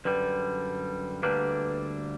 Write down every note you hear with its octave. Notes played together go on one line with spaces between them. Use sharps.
F#2 D3 G3 B4
D2 D3 G3 A#3 D4 B4